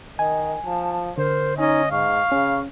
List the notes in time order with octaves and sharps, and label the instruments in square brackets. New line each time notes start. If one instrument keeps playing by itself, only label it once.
[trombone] D#3 [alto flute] D#5 [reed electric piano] G#5
[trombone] F3 [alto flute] A5
[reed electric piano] D3 [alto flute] A#4 [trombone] C5
[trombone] C#4 [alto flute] D#4 [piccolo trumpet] D#5
[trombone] G#2 [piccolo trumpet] F5 [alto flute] C#6
[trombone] C#3 [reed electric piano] C#4